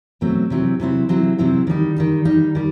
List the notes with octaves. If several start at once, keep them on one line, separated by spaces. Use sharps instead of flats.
B2 F#3 A3 C4
C3 F#3 C4 E4
C3 F#3 C4 E4
C3 F#3 C4 E4
C3 F#3 C4 E4
D#3 G3 D#4
D#3 G3 D#4
D#3 G3 D#4
D#3 G3